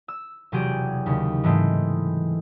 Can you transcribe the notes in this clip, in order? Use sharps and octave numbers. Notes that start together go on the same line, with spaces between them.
E6
E1 C3 F#3 G4 G#4 G5
D#2 C#3
G#2 E3 G#3 A3 C4